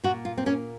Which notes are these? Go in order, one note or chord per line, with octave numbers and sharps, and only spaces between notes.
A#2 F#4
F4
C4
A#3 C#4